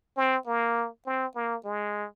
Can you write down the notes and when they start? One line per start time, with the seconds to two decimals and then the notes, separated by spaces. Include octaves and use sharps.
0.17 C4
0.47 A#3
1.06 C4
1.35 A#3
1.65 G#3